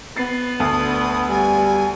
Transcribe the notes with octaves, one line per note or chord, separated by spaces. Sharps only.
B3 A6 C7
D2 D3 A5 D#6
G3 G#5